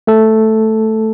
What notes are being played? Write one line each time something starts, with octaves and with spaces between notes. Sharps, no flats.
A3 A4